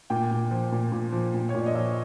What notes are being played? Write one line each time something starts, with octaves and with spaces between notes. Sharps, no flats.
A#2 G5
A#2
F3
A#2
A#2
F3
A#2
C#5
A#2 D5
D#5
F3 E5